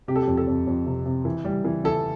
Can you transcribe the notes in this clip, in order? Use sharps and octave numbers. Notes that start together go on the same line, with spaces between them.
C3 G4
A4
G4
F2
A4
F2
F2
C3
C3
E3
G3
E3
E3 A4